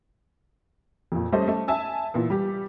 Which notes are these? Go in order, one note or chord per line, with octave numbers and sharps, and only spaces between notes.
F2 A#2
G3 A3 C#4 C5 D#5
A3
E5 G#5 A5 E6
A#2 E3 B3
G3 G4